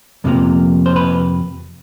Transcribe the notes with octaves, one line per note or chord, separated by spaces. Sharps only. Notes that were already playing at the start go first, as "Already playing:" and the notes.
F2 C3 F3 A#3
C5
B4